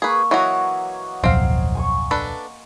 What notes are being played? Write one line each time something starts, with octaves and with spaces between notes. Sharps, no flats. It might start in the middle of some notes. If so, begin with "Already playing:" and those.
A#3 G#4 B4 C#6
E3 F#3 F#4 C#5 D#5 F#5
D1 B1 F2 C4 F5
G#5 C6 C#6
D4 A4 B4